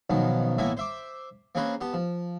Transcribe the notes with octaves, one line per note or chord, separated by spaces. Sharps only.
B1 F#2 D#3 F3 B3
A2 E3 A#3 B3 E5 G#5
C5 E5 D6
A#3 C4 C#4 G#4 B4 C5
B3 G4 A5
F3